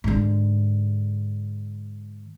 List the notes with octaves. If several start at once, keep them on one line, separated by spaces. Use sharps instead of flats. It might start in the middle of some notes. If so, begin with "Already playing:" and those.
G#2 D3